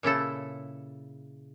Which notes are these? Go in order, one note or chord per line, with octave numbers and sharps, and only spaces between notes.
A#2 C#3 E4 A4